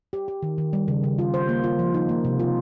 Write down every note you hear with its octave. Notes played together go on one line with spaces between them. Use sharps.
G4
G4
D#3
D#3
G3
C#3
C#3
F4
C5
A#3
F4
F3
D#4
A#3
C3
F4